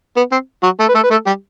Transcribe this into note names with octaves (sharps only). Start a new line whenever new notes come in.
B3
C4
F#3 F#4
A3 A4
B4
A3 A4
B4
A3 A4
G3 G4